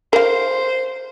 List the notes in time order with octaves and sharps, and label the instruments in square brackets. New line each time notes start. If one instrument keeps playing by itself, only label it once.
[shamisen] A#4 F5 [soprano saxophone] C5